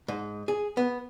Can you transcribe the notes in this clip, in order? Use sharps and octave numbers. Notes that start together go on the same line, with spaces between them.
G#2
G#4
B3